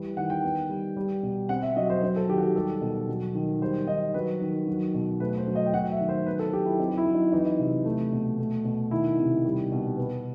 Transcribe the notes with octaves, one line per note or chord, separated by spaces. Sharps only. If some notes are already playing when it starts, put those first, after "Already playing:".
Already playing: E3 G3
D#3 F#5
G5
B3
G3
G3
B2
C4 F#5
E5
F#3 D#5
C5
F#3 C5
A4
D#3 G4
F#4
G4
G3 A4
B2
F#3
D#3
G3 C5
D#3 D#5
F#3 B4
D#3
F#3
B2
A3 B4
C5
F#3
D#5
G5
F#3 F#5
E5
D#3
C5
B3 B4
A4
F#3 G4
E4
C4 D#4
E4
F#3
D#4
E3 D#4
C3
A3
B2
A3
B2
D#3 E4
C3
G3
B2
B3